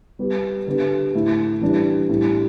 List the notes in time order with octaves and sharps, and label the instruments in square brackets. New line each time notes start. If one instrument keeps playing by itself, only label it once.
[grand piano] G3 B3 G4
D3 B3 G4
A2 A3 E4
E3 G3 D4
A2 G3 D4